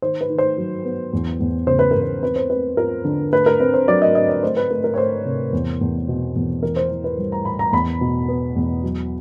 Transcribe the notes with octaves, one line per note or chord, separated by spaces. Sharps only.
D#3 C5
B4
D#3
C5
F#3
B3
E2
E2
C#3 C5
B4
E2 A#4
B4
C4 B4
C5
C4 B4
F4 A#4
D3
A3 B4
A#4
C4 B4
C5
F#3 D5
D#5
C4 D#5
D5
A3 C5
B4
A3 A#4
A#4
C#5
A3 C5
C3
E2
E2
B2
E2
E3 A#4
C5
E3
B4
G3
A#5
A2 B5
A#5
E2 B5
B2
B3
E2
F#3